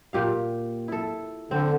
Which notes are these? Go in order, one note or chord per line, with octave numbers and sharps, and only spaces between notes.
A#2 G4 F5
E4 A4
D3 C4